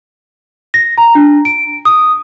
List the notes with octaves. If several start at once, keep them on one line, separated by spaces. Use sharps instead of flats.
A#6
A#5
D4
D7
D#6